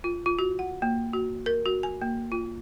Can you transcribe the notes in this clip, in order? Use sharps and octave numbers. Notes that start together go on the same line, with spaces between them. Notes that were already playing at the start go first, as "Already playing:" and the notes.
F4
F4
F#4
F#5
A#3
F#4
A#4
F#4
G#5
A#3
F4